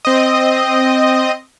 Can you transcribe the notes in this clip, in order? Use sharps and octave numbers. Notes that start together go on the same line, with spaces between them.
C4 D#5